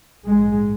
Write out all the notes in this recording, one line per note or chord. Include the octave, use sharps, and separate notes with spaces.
A#1 G#2 G#3